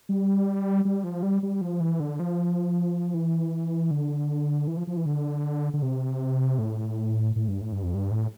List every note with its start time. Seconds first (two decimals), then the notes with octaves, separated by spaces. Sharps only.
0.09 G3
0.85 G3
1.04 F3
1.23 G3
1.43 G3
1.61 F3
1.80 E3
2.00 D3
2.19 F3
3.14 E3
3.91 D3
4.67 E3
4.77 F3
4.87 F3
4.97 E3
5.06 D3
5.74 D3
5.82 C3
6.59 A2
7.36 A2
7.48 G2
7.61 A2
7.72 G2
7.83 F2
7.94 G2
8.11 A2